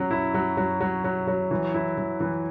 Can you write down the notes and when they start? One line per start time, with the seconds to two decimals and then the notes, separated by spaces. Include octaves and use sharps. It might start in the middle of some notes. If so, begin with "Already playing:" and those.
Already playing: F#3 C#4
0.11 E4
0.34 F#3
0.57 F#3
0.81 F#3
1.04 F#3
1.27 F#3
1.51 E3
1.74 E4
1.97 E3
2.20 E3